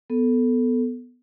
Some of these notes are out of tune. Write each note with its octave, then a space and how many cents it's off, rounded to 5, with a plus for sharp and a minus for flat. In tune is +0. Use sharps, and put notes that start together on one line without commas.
B3 +0 A4 +0